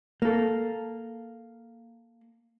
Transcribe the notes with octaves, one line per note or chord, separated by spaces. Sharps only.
A#3 A4